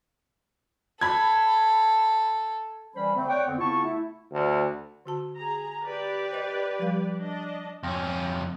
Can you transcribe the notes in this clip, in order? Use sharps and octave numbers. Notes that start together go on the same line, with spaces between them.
A4 B5 G#6
E3 G3 C#4 C5 B5
D3 A3 C4
C#5 D5 F#5 G5
F2 D3 B3 C4
C#3 B3 E4 F4 A5 C#6
A3 E4
D2
D3 F#4 A5
G#4 A#5
G4 B4 D5
C5 D#5
F3 G3 F5
D4 D#5
F2 C#4